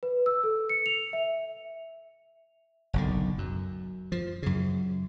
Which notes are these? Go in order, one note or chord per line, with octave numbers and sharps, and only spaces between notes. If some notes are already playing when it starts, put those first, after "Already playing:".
B4
E6
A4
C#7
F7
E5
F#1 B1 D3
F#2
F3
F#2 C#3